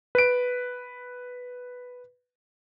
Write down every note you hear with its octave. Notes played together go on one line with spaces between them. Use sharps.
B4 D7